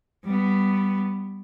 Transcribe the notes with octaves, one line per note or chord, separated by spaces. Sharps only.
G3 B3